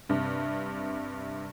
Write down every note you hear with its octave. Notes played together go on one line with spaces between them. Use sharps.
G2 C3